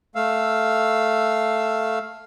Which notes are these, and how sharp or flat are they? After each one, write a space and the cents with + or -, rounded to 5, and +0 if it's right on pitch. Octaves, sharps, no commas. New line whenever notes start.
A3 +0 F5 +0 E6 +5